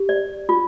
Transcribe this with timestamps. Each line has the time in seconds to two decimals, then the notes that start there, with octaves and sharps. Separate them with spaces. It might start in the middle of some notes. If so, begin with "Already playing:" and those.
Already playing: G4
0.09 D5
0.49 F4